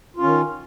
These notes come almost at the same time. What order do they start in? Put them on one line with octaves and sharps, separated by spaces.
F4 C#4 D#3